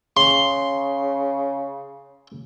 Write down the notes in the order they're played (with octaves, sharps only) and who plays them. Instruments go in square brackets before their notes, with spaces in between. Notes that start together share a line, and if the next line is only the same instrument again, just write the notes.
[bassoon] C#3 [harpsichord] C6